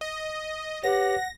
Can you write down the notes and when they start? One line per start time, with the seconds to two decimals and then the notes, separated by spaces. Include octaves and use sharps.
0.01 D#5
0.83 G4 B4 C#5 F#5 A#6